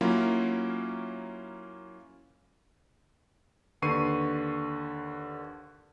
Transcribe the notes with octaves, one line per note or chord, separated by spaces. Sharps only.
F#3 A#3 C#4 E4 F4
D#2 D3 B4 C#6 C7 D#7